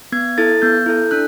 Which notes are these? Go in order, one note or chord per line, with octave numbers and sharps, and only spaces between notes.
B3 G#6
E4 A4 A6
B3 G6
E4 A4
D4 F#6